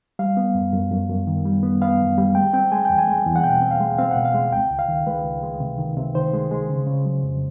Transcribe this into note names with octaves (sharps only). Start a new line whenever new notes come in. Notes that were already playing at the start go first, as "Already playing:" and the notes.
G3 F5
B3
F#2
F#2
F#2
F#2
D#3
G3
B3
B3 F5
F#2
G3
G#3 G5
C4 G5
G#3 G#5
E2 G5
G#5
G#3
E2
F#5
B2 G5
C4
F5
G#3
C4 F5
B2 F#5
F5
G#3
C#2 G5
C#2
F5
D#3
G#3 B4
C#2
G#3
C3
D#3
C3
D#3 C5
G#3
G#3
C#3
C#3
F#3
F2